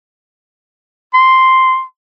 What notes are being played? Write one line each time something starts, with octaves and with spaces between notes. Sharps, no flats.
C6